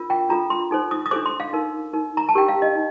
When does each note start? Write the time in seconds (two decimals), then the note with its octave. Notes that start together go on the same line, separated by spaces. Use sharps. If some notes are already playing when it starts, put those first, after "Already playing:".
Already playing: D4 F4 A#4
0.10 G5
0.29 D4 F4 A4 A#5
0.50 C6
0.71 D#4 A4 C5
0.91 D#6
1.06 D#6
1.11 D4 A4 C5 D6
1.26 C6
1.40 F5
1.53 D#4 A#4
1.93 D#4 A#4
2.17 A#5
2.29 A5
2.35 D4 G4 A#4 G5
2.48 F5
2.62 D#5
2.75 D#4